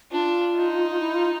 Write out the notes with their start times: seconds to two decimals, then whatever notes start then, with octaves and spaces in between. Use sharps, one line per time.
0.11 D4 F4
0.56 D#4
1.00 E4
1.14 F4